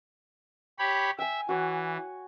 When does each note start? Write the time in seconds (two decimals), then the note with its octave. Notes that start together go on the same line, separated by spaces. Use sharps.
0.79 G4 C#5 B5
1.19 E5 G5 G#5
1.49 E3 F#4 C#5